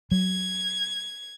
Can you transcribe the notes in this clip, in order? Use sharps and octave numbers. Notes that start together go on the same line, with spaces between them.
F#3 G#6